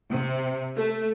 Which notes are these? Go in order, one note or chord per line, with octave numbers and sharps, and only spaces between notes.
C3
A3